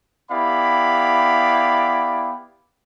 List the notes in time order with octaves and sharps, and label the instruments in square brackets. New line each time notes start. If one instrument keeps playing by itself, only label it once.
[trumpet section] B3 E4 G4 D5 F5 B5